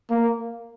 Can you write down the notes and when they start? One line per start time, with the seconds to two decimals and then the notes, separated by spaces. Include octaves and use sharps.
0.10 A#3